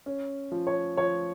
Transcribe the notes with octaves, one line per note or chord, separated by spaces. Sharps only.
C#4
F3
C#5
F3 C#5